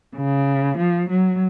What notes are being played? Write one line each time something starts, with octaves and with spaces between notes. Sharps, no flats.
C#3
F3
F#3